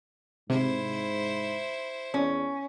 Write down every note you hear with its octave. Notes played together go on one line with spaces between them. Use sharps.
G#2 C3 E4 C5
E2 C#4